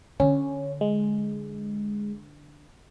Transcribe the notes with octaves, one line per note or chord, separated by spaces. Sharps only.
D3 C#4
G#3